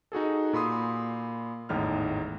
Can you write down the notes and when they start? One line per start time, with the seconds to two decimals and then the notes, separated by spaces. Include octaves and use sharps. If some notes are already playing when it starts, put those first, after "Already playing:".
0.12 D#4 F#4 G#4 A4
0.53 A#2 B5 C6 D#6
1.69 G#1 E2 A2 D#4 F6